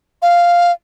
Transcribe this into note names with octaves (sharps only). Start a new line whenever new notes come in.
F5